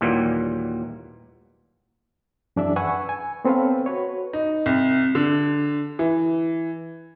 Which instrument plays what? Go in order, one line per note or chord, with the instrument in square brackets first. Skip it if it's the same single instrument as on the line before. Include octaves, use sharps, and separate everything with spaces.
[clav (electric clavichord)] D#2 A#2 E3 F#3 G3
[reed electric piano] F#2 E3 D4 G#4 D5 E5
B4 F#5 G#5 C#6 E6
G#5
B3 C4 A4 B4 C#5 F5
F#4 B4 C#5
[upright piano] D#4
C2
D3
E3